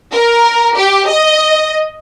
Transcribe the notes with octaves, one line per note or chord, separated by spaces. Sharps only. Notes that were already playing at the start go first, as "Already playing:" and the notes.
A#4
G4
D#5